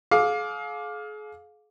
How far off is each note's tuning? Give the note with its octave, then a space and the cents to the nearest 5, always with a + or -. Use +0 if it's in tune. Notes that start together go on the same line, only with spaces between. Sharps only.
G#4 +40 F5 +20 D6 +0